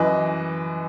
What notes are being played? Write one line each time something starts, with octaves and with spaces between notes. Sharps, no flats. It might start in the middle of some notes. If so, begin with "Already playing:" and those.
Already playing: F#2 E3 B4 D#5